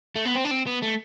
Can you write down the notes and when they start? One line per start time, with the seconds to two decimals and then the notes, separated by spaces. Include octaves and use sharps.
0.16 A3
0.25 B3
0.35 C4
0.44 D4
0.51 C4
0.67 B3
0.82 A3